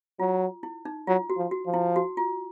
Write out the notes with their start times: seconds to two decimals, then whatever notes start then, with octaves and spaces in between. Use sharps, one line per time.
0.19 F#3 F4
0.63 E4
0.85 D#4
1.07 F#3 F4
1.30 F#4
1.37 F3
1.51 F#4
1.66 F3
1.74 E4
1.96 F#4
2.17 F4